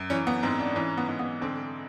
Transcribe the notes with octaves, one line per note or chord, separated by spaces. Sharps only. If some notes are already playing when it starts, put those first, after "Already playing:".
Already playing: F#2
E3 C#4
B3
G#2 C4
D4
E3 C#4
B3
G#2
B3
D3 C4